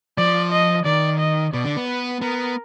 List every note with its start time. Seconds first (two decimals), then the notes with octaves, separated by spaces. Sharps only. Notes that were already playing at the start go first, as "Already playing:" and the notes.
0.18 F3 D5
0.52 D#5
0.85 D#3 D5
1.20 D#5
1.53 B2 D5
1.65 D3
1.76 B3
1.87 B4
2.21 B3 A#4